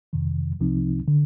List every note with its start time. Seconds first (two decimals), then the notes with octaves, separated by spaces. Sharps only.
0.13 F2 C3 D#3
0.60 C2 C3 F3 C4 D#4
1.08 D3